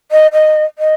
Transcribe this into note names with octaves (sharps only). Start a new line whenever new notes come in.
D#5
D#5
D#5